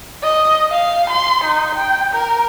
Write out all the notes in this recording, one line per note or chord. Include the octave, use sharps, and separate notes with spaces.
D#5
F5
C6
D#4
G5
A#4